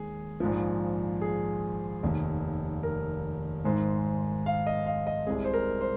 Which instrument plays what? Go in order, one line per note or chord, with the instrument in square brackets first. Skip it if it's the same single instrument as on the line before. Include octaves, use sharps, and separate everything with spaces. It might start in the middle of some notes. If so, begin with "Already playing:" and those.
Already playing: [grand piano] D#2 D#3 G#3 G#4
A#1 G#2 F3
G#4
F1 D#2 D#3
A#4
G#1 G#2 G#3 C5
F5
D#5
F5
D#5
C2 C3 G#3 G#4
C5
A#4
C5